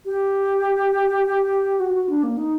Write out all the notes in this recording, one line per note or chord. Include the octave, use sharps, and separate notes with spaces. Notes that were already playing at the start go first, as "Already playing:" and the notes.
G4
F#4
F#4
D4
A#3
D#4